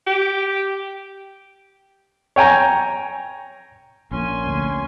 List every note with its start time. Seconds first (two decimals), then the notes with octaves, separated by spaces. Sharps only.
0.07 G4
2.36 C#5 G5 G#5 A#5
4.11 A#1 A#2 A#3 C#4 G#5 C6
4.47 D2